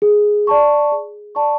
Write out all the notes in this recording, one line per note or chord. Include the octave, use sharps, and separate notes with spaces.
G#4
D5 A5 C#6
G#4
D5 A5 C#6